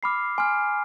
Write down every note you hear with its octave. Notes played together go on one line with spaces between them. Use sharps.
B5 D6 F6 C7
G#5 C6 F6